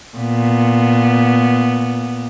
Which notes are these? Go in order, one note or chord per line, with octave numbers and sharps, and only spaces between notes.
A#2 B3